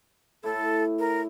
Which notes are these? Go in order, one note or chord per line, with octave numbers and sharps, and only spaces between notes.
A2 E4 A4
A#4